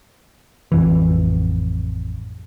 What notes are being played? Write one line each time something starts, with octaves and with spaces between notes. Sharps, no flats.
A1 F2 E3